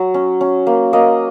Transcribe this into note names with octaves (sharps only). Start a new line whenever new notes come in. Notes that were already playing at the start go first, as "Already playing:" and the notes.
Already playing: F#3
C#4
C#4
A#3
A#3 D#5